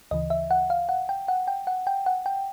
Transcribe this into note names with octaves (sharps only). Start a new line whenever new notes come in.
D2 C#3 E3 D#5
E5
F#5
F5
F#5
G5
F#5
G5
F#5
G5
F#5
G5